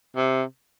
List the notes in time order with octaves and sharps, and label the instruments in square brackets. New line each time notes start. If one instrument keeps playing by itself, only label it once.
[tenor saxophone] C3